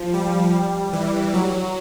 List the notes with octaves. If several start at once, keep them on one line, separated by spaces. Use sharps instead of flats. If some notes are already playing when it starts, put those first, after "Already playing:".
Already playing: F3
G3
E3
F#3